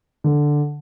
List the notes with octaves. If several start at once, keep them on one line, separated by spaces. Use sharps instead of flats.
D3